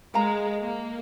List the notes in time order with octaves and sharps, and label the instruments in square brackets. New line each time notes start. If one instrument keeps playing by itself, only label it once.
[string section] G#3 [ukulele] A#4 F5 A#5
[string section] A#3